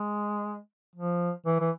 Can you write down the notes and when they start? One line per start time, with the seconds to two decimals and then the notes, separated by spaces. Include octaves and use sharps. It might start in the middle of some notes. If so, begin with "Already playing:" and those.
Already playing: G#3
0.96 F3
1.46 E3
1.61 E3